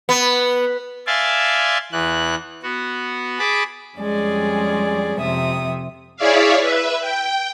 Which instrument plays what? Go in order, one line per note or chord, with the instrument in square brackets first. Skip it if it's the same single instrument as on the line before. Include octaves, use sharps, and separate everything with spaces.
[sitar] B3
[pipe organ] D5 E5 F5 G#5 A5 C6
E2 E3 F#6
B3 F#4
G#4 A5 B5 D6
[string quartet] F2 G3 G#3 C#4 G#4 D5
F2 C3 E5 D#6
[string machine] E4 G#4 C#5 D5 E5 F5
B4 E5
G5